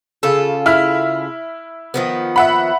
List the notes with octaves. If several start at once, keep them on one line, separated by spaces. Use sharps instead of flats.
C#3 F4 A4
E4 F6
D#3 F3 B3
E5 F#5 B5